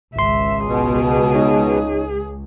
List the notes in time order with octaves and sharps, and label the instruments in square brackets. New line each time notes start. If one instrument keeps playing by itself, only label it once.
[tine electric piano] G#1 C6 [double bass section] C#2 [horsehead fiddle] E5
[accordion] B2 [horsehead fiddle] G#4
[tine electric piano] D#4 C#5 D#5